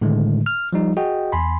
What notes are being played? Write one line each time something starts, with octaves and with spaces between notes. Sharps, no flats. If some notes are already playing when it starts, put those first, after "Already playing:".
A2 D3 D#3 G#3 A3
F6
F3 G3 D#4
F#4 G#4 D#5 G5
E2 G#5 B5 C6